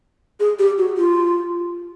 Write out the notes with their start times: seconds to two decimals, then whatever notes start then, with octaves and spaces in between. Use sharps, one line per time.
0.40 G#4
0.59 G4
0.78 F#4
0.97 F4